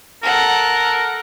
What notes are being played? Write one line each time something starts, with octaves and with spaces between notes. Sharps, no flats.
A4 A#4 F#5